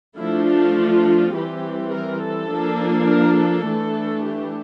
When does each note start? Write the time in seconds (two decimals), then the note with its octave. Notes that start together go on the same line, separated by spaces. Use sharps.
0.17 F3 A3 D4 E4
0.46 F4
1.33 E3 G3 C4 G4
1.91 A#4
2.22 A4
2.50 F3 A#3 D4
3.08 A#4
3.37 A4
3.67 E3 A3 D4
4.25 G4